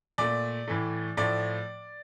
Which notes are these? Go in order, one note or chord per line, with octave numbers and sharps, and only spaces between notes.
A#2 A3 D5
A2 E3 A3
A2 F3 A3 D5